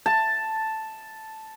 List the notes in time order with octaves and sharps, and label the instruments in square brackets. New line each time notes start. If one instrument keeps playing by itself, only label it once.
[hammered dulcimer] A5